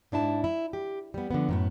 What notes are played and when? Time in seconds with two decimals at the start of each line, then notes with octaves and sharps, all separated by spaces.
0.12 G#2 D4 E4 A5
0.44 E4
0.73 G4
1.14 G3 B3
1.31 D3 F3 B3
1.49 F#2 A2 B3